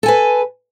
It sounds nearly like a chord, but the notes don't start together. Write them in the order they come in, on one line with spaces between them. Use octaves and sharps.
A4 G#5 B4